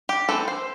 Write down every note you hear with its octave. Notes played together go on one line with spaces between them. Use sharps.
G4
E3 A3 C4 A4
C5